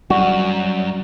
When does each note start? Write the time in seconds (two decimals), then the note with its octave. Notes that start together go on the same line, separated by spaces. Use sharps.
0.10 F#2 G3 F#4